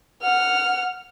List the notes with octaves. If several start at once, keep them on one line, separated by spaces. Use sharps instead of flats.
F#5 F6